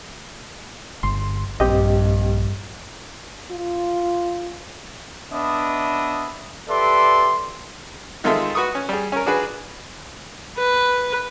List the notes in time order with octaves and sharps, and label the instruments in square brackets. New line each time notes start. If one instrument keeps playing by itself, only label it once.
[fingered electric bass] G1 [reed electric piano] C6
[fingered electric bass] A#1 [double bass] G2 [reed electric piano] C4 G4 D#5
[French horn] F4
[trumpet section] B3 D4 D#5 E5 B5 D#6
G4 A4 B4 D5 E5 C6
[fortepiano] D#3 G#3 C4 F4 A4 E5
F#4 B4 C#6 D#6
C#4
G3 G#4
C#4 A#4
D4 F#4 G#4 B4
[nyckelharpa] B4